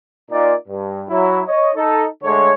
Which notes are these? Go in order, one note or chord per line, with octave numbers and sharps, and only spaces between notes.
A#2 D#4 D5
G2
F#3 E4
C#5 D#5
D#4 A4
D3 G#3 A3 C#5